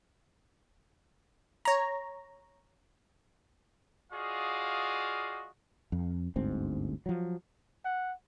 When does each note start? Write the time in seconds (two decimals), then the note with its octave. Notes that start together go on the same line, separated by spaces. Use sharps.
1.65 C#5 A#5
4.12 F4 F#4 G#4 D5 D#5 F5
5.92 F2
6.36 G1 D2 G#2 C4
7.06 F3 F#3
7.85 F#5